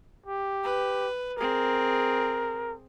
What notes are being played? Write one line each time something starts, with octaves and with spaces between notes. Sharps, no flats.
G4
B4
C4 G#4 A#4